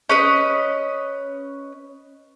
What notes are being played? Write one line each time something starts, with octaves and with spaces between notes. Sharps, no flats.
C#4 B4 D#5